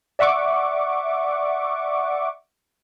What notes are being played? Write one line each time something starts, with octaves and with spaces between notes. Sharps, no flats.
D5 E5 F#5 C#6 D6